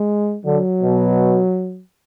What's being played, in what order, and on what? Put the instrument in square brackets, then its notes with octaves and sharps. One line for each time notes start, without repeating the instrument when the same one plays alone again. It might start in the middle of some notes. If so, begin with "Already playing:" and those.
Already playing: [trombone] G#3
[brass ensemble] D3 [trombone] F#3
[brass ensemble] B2